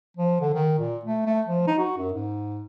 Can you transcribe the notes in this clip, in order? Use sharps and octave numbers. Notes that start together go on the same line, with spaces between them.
F3
D3
D#3
A#2
A3
A3
F3
D#4
F#4
F#2
G#2